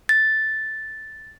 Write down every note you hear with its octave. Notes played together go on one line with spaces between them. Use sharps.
A6